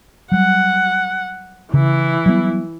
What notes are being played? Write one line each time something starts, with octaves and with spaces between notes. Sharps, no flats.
F#3 G3 F#5
C#3 E3 E4
F#3 G3 B3